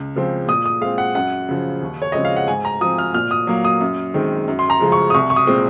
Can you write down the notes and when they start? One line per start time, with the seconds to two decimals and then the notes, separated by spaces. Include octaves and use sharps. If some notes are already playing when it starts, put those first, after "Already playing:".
Already playing: C#2
0.15 C#3 F3 G#3 C4
0.48 A#2 D#6
0.66 D#6
0.81 G#3 C4 F5
0.98 F#5
1.15 F#2 F#5
1.49 C#3 F3
1.82 D#2
2.02 C#5
2.12 C#3 F3 G#3 C4 D#5
2.25 F5
2.36 F#5
2.48 G#2 G#5
2.65 A#5
2.81 F3 C4 D#6
2.98 F6
3.14 A#2 F6
3.31 D#6
3.47 F#3 A#3
3.65 D#6
3.81 F#2
4.14 D#3 G#3 C4
4.48 F#2
4.59 C6
4.70 A#5
4.80 C#3 F3 G#3
4.92 C#6
5.10 D#6
5.14 C2 C#6
5.30 C#6
5.36 D#6
5.47 A#2 G#3 C4